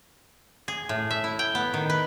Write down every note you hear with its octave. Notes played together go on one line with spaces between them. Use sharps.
G#4
A2
E5
E4
G5
B3
D#3
B4